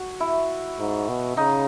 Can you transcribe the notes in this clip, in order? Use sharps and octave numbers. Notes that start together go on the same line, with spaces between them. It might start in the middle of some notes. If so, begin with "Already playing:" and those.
Already playing: F#4
E4
G#2
B2
C#3 D#4